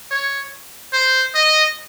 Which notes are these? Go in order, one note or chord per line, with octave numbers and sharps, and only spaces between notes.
C#5
C5
D#5